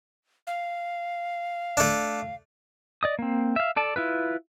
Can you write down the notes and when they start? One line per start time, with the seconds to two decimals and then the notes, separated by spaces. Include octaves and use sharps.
0.47 F5
1.77 A3 D4
3.03 D5 D#5 D#6
3.19 A#3 C4
3.56 E5 F5
3.76 A4 D5 A5
3.96 E4 F4 B4